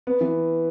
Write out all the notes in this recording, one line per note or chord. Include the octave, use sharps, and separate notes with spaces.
B3
E3